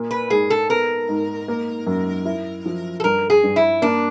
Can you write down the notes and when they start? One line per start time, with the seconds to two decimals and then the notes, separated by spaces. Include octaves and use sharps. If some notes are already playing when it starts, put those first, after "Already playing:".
Already playing: A#2 A#3
0.11 B4
0.30 G#2 G#4
0.50 A4
0.70 B3 A#4
1.09 G#2
1.48 A#3
1.86 F#2
2.25 E4
2.65 F3
3.00 A4
3.04 G2 A#4
3.30 G#4
3.43 G2
3.56 E4
3.82 A#3 D4